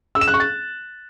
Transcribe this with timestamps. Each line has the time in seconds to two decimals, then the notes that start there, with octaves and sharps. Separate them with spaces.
0.15 E6
0.21 E7
0.28 F#6
0.34 C#6
0.40 A6